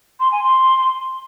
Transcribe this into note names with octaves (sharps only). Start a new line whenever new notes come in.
C6
G#5
C6